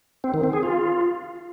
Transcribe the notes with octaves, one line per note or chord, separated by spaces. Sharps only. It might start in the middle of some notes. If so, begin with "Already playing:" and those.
C4
D#3
C4
G#4
F4